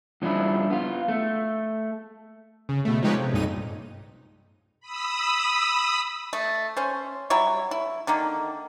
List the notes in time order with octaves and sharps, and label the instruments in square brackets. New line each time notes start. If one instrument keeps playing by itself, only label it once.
[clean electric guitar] G2 F3 C#4 D4 E4
B3 F4
A3
[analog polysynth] C#3
B2 A3
F3 G#3 D#4 G4 B4 C#5
C3
B1 G2 A#2 D#4 D#7
[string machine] B5 D#6 E6
[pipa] A3
C#4 C5
F#3 G3 E4 C#5
E4
D3 D#3 A#3